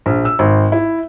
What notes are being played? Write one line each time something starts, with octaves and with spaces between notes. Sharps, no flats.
A#1
E6
G#1
E4